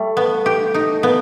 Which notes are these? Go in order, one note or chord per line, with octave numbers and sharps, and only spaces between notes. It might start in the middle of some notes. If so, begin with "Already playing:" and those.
Already playing: G3 A3
B3
G4
D#4
B3